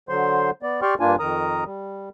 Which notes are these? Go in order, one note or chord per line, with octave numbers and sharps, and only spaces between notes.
D3 F#3 C5 C6
B3 D5
G4 D5 G5 C6 C#6 F6
G2 A#3 D4 F4 G#5
F2 D#3 A#4 A#5 D#6
G3